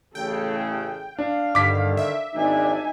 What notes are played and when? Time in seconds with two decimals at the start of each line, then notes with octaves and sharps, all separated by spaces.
0.15 A1 C#3 A4 G5
1.19 D4 F5
1.55 G2 D3 D#3 D6 B6
1.97 E5
2.34 G#1 D4 D#4 G#5